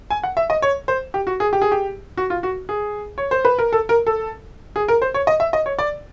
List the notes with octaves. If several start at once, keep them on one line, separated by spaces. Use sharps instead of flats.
G#5
F#5
E5
D#5
C#5
C5
G4
F#4
G#4
G4
G#4
G4
F#4
F4
F#4
G#4
C#5
C5
B4
A#4
A4
A#4
A4
G#4
A#4
C5
C#5
D#5
E5
D#5
C#5
D5